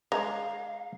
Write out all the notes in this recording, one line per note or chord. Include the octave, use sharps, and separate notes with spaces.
G#3 F5 A#5